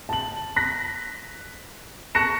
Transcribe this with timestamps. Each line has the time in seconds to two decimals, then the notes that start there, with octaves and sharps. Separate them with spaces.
0.09 A5 F#7
0.56 F#6 A#6 B6
2.15 A5 C#6 F#6 A#6 C#7 E7